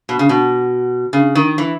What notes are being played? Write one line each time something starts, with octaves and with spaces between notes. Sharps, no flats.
B2
C#3
B2
C#3
D#3
E3